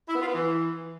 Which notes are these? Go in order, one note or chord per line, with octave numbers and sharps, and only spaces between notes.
E4
B3
F4
B3
E3